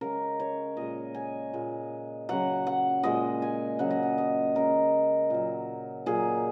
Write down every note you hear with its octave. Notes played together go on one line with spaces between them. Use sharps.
C#3 G#3 A#4
C#5
A#2 G#3 D#5
G#5
A#2 G#3
C#3 F#3 F#5
F#5
A#2 G#3 D#5
G#5
C#3 F#3 F#5
D#5
F#5
D#5
C#3 G#3 A#4
A#2 F#3
A#2 F#3 G#4